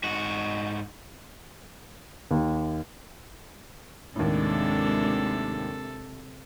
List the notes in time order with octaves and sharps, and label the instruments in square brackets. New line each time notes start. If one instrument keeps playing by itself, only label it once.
[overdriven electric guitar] G#2 F#4
[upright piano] D#2
[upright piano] D#2 A2 [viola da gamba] C3 A4 [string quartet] G#3 D4